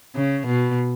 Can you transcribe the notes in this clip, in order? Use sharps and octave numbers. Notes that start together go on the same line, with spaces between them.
C#3
B2